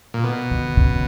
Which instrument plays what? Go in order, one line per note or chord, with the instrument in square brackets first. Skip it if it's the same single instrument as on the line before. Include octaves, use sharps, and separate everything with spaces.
[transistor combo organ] A#2
B2
[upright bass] D3
C#3